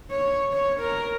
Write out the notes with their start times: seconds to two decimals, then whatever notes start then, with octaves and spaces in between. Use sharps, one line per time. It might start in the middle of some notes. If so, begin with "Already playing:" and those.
0.10 C#5
0.53 C#5
0.80 A#4